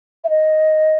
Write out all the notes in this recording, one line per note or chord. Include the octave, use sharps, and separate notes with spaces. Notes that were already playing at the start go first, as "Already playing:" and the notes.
E5
D#5